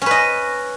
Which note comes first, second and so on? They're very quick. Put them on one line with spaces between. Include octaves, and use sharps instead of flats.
C#4 B4 D#5